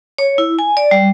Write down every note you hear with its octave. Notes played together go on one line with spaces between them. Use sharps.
C#5
E4
G#5
D5
G3